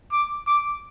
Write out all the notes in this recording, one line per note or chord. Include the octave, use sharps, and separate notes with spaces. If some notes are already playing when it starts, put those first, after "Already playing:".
D6
D6